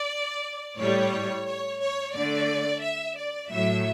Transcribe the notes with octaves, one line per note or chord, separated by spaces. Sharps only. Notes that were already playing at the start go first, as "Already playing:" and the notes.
Already playing: D5
A2 G3 C#5
C#5
C#5
D3 A3 D5
E5
D5
A2 F#3 A3 E5